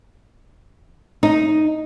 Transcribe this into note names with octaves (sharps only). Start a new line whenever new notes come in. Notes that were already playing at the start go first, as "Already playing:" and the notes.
D#4